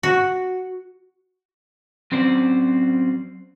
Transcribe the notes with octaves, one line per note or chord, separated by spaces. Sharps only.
F#4
F#3 C4 C#4 C5 D5